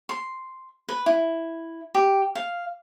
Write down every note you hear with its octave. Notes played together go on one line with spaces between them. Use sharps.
C6
B4
E4
G4
F5